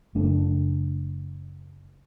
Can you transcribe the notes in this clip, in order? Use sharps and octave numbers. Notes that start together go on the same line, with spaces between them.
F#1 A3 D4